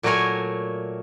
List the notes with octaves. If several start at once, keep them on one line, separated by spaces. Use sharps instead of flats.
A#2 F#3 A3 A#4 C#5 G#5